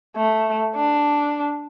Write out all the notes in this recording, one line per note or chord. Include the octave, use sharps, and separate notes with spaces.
A3
D4